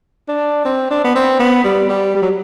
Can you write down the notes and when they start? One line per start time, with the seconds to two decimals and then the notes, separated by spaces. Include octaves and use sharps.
0.28 D4
0.65 C4
0.90 D4
1.04 B3
1.15 C4
1.39 B3
1.64 G3
1.89 G3
2.15 G3
2.22 F#3